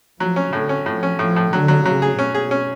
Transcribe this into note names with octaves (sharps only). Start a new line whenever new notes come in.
F3 F#3
C#4
A2 D3
C#4
A2 F3
C#4
A2 F3
A2
D3 F#3
F#3
C#3 F#3
G#4
B2 C#4
G#4
C#4